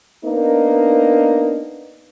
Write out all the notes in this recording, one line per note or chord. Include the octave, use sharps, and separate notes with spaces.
A#3 B3 D4 D#4